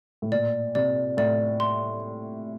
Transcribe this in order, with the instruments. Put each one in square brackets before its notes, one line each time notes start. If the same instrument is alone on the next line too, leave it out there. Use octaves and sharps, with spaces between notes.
[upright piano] A2
[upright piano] A#2 [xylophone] D5
[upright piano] C3 [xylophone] D5
[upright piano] A2 [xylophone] D5
[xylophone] C6